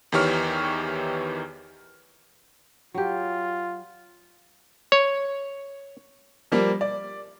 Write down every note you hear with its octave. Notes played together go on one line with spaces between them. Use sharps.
E2 D#3 E3 G4 C#5 F6
F#3 F4 G4
C#5
F3 G3 A#3
D5